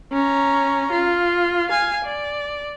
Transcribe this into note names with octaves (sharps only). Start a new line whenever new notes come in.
C#4 A#5
F4
F5 G#5
D5